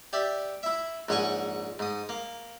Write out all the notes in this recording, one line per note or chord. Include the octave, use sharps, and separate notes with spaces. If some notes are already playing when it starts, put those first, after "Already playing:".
G4 D5 E5
E4 E5
A#1 G#2 C#5 F#5 G#5 C#6
G#2 D#6
A#3